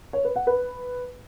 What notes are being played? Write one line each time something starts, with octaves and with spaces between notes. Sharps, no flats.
C#5
B4
F#5
B4